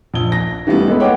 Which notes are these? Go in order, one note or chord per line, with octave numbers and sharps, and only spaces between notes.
A#1 G7
A#6
E3 G3 A3 B3
G#3 G4 A4 B4
C#5 F#5 G5 D6